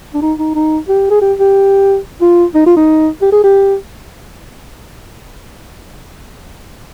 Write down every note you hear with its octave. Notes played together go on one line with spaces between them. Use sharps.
D4
D#4
D#4
D#4
G4
G#4
G4
G4
F4
D#4
F4
D#4
G4
G#4
G4